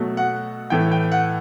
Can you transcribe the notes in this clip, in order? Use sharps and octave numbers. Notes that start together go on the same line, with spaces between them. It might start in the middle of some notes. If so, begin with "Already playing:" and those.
Already playing: B2 F#3 A3
F#5
A2 E3 A3 G5
G5
F#5